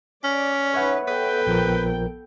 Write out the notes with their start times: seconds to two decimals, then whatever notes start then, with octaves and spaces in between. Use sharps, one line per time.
0.24 C#4 D5
0.74 D#4 B4 C#5 E5 F#5
1.08 B3 A4 B4 G5
1.47 A#1 F3 A#4